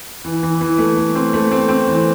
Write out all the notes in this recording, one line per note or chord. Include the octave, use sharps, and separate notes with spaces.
E3
E3
E3
A3
A3
C4
A3
C4
C4
E3